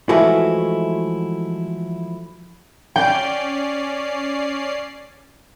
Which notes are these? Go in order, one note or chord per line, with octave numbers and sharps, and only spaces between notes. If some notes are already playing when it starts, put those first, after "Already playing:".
E3 F3 G#3 A3 E4 F#4
C#4 D5 G5 C7